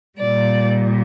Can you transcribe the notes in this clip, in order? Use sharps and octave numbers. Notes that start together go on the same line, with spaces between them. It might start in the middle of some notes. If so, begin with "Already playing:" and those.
A#2 G3 D5